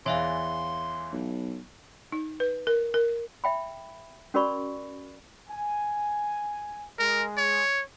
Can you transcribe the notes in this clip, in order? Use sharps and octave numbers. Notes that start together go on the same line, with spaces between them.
E2 E3 C#5 E5 F5 C6
B1
D#4
B4
A#4
A#4
E5 G5 B5
C#4 F#4 A#4 D5 B5 C#6
G#5
G#3 A#4
C#5